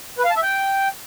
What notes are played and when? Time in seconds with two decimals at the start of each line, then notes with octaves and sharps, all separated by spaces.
0.18 B4
0.24 F5
0.30 A5
0.36 E5
0.43 G5